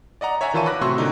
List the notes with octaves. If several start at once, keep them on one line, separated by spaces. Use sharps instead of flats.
D5 D#5 F#5 A#5
C#5 E5 F#5 G#5 A#5
D#3 E3 F4 A5 C#6 D#7
B5 D6 F#6 A#6
A2 C3 F#4 C6 C#6 E6
A#2 D3 D#4